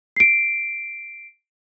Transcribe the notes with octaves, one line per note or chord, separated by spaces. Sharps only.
C7 D7